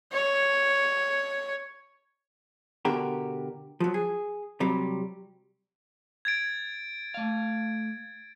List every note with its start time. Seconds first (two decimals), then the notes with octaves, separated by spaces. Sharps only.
0.12 C#5
2.85 B2 D3 F#4 G4 A#4
3.80 F3 F#3
3.94 G#4
4.60 C3 F#3 G3
6.25 G#6 A6 D7
7.14 A3 F5